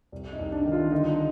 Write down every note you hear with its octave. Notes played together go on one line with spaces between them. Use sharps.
C2
D#4
C2
D4
D#3
F4
D3 D#4